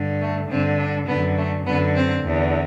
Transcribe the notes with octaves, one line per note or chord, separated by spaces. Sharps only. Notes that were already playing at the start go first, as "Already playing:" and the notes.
Already playing: G2 D3
A3
G2 D3 C4
D4
F#2 D3 B3
A3
F#2 D3 B3
C4
E2 D3